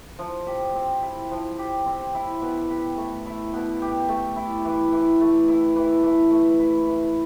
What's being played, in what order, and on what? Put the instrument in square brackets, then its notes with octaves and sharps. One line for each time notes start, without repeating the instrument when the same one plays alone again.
[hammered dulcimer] F3
G4
C4
E4
F3
G4
C4
E4
B2
G4
A3
E4
B2
G4
A3
E4
E3
E3
A3
E4
E3
E3
A3
E4
E3